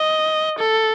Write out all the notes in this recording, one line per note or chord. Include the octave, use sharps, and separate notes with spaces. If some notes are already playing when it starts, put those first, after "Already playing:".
Already playing: D#5
A4